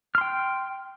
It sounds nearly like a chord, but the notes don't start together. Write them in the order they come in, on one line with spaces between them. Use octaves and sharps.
F6 C6 G5